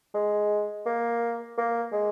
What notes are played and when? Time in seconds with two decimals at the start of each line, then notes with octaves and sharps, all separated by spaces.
0.14 G#3
0.86 A#3
1.58 A#3
1.93 G#3